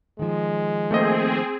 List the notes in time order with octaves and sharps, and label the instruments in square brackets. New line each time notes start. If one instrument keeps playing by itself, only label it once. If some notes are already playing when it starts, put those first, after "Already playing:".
[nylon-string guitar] D#3 F3 [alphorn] G#3
[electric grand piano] A3 A#3 D#5 [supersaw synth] C4 G#4